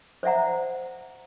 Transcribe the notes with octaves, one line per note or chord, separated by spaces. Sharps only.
C5 D5 E5 F#5 A#5